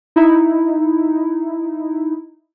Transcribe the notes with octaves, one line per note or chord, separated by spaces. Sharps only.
D#4 E4